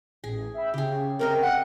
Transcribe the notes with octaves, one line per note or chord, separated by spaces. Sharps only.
A1 G#4
E5 G5 B5
C#3 G4 G#4
C3 C4 A#4 D#5
F#5